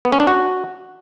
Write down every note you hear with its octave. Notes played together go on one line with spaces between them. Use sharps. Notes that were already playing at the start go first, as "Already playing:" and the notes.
B3
C#4
D4
F#4